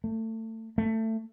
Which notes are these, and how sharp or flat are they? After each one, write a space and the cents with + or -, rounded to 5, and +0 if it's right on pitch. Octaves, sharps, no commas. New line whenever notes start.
A3 +25
A3 +20